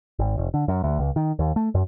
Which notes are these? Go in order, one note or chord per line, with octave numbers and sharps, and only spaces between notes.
G#1
F1
D3
F#2
D2
C#2
D#3
D#2
A3
F#2